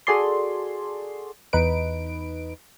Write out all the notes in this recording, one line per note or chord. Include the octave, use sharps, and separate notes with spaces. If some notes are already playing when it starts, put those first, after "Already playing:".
F#4 G#4 A4 D5 C6
E2 D#4 B4 D7